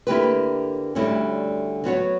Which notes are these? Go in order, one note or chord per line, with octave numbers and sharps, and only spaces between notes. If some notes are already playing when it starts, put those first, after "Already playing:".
D3 A#3 E4 G4 B4
D2 D3 G3 C#4 E4
F#3 B3 F#4 C#5